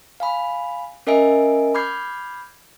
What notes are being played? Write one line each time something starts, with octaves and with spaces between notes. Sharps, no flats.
F5 G#5 B5
C#4 A#4 D#5 E5 G#5 D7
B5 D6 F6 G6 G#6 C7